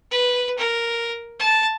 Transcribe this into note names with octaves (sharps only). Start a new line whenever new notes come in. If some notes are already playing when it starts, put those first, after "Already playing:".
B4
A#4
A5